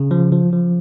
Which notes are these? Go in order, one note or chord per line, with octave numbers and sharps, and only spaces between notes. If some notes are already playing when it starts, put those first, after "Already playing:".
Already playing: C#3
F3
F3
F3